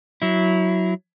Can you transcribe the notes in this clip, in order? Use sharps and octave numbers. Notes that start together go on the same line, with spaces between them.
F#3 E4